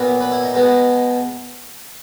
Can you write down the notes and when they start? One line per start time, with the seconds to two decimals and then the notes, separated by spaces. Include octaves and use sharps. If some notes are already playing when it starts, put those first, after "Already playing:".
Already playing: A#2 F#3 B3
0.20 B4
0.31 E4
0.43 D#4
0.54 B2 G#3 B3